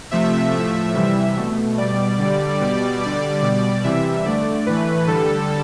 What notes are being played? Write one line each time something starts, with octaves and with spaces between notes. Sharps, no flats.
C3 F3 A3 E5
A2 F3 A3
C3 E3 G3
B2 A3
B2 G3 D5
D3 G3
B2 G3 D5
D3 G3 D5
B2
G3
C3 E3 G3 E5
D3 A3 D5
A2 E3 A3 B4
D3 G3 A4